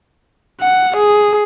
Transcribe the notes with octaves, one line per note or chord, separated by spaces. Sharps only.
F#5
G#4